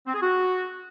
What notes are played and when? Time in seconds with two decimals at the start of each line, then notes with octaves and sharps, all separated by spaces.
0.07 C4
0.15 G#4
0.22 F#4